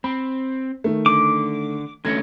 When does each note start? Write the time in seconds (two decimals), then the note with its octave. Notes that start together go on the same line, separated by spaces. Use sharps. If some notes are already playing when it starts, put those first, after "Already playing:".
0.04 C4 B5
0.84 D#3 A3
1.06 D3 D6
2.05 D3 A3 C#4 G#6 A#6 C#7